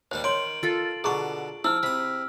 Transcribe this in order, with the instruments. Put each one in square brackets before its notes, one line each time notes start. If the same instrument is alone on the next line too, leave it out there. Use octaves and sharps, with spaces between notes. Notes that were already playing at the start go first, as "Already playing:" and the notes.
[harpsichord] D#2 D#3 G3 [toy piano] C5
[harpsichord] D#3 [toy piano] C#5 C6 [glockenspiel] D7 F#7
[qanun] F4 A4
[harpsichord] B2 D3 [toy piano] G#4 A#5 C#6
[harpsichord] F3 [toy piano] E4 [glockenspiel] E6 F6
[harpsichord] C3 D#6 [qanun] B5